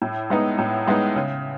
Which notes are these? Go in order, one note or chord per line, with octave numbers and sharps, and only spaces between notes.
A2
G#3 B3 D#4
A2
G#3 B3 D#4
C#3